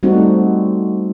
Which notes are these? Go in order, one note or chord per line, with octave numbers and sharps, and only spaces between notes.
G3 A3 C4 D#4 F#4